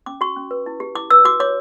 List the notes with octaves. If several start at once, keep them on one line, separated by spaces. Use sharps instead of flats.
C#4 D6
F#4 C#6
C#4
B4
E4
G4
E4 D6
B4 E6
F#4 D6
C#5 D6